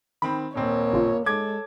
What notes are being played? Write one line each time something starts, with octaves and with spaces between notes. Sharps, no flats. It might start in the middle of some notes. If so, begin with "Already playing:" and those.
D#3 C4 B5
D#1 A#3 C4 C#5
A1 C#3 F4
G#3 A4 D6 G#6